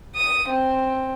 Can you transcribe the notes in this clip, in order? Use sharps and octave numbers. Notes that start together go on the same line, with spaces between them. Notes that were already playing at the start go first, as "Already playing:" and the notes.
D#6
C4